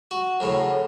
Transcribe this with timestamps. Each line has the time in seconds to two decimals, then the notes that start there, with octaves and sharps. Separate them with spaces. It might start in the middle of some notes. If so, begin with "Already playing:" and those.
0.11 F#4
0.40 F#2 A2 C#3